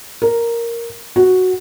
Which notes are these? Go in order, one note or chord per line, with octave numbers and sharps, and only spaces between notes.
A#4
F#4